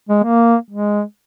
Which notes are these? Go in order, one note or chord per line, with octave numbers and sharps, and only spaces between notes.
G#3
A#3
G#3